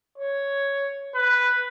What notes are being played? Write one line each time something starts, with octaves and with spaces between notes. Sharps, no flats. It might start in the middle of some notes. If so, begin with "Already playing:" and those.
C#5
B4